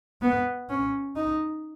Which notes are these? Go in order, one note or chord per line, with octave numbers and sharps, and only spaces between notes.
B3
C#4
D#4